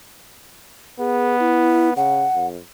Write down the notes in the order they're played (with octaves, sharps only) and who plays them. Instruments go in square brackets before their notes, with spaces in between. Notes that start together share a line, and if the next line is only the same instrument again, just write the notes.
[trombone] B3 [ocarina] G#4
[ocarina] E4
[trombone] C#3 [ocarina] F#5
[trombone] F2